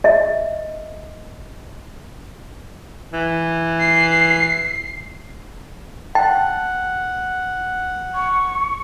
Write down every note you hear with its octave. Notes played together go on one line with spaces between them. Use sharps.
D#5 E5
E3
C7
F#5 G5 A5
C#6